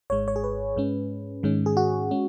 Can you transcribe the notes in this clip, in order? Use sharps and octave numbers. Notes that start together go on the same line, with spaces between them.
G#1 G#2 G#3 C#5
C#5
G#4
B4
G#2 G#3 C#4
G#2 D#3 G#3 C#4
G#4
F#4
G#3 C#4